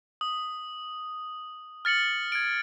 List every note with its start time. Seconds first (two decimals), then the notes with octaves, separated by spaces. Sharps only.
0.21 D#6
1.85 F6 A6 C#7 F#7
2.32 G#6 D7